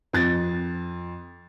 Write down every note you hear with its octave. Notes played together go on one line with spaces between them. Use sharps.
F2 A6